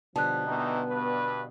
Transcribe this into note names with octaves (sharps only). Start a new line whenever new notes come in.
B2 D3 F3 G3 A5 F#6
D#3 E3 B3 D#4
G2 B4